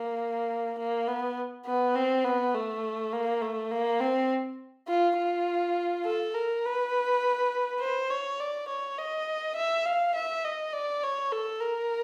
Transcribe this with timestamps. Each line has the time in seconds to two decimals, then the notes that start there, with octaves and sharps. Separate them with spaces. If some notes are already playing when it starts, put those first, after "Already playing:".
Already playing: A#3
0.79 A#3
1.08 B3
1.66 B3
1.96 C4
2.24 B3
2.54 A3
3.13 A#3
3.41 A3
3.71 A#3
4.01 C4
4.88 F4
5.18 F4
6.05 A4
6.34 A#4
6.64 B4
7.80 C5
8.11 C#5
8.40 D5
8.69 C#5
8.98 D#5
9.56 E5
9.86 F5
10.15 E5
10.45 D#5
10.73 D5
11.03 C#5
11.32 A4
11.61 A#4